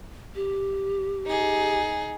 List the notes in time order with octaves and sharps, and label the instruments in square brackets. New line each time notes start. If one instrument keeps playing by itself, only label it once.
[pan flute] G4
[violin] D#4 G#4